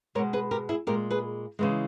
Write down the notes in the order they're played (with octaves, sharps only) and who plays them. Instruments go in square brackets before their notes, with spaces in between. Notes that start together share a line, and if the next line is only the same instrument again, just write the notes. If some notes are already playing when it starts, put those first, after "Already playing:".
[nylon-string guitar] G#3 A#4 C#5
B2
G#4 B4
G4 A#4
E4 G#4
A#2 G#3 G4 A#4
G#4 B4
C#3 E3 G#3